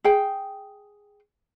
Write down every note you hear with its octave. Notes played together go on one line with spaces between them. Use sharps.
G#4 G5